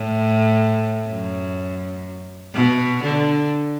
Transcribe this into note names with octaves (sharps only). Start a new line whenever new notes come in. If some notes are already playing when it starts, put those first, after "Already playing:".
Already playing: A2
F#2
B2
D3